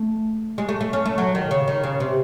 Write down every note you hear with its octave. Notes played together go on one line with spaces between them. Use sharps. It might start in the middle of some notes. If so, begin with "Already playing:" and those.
Already playing: A3
G#3
A3
A3
C#4
A3
F#3
D#3
C#3
D#3
C#3
C3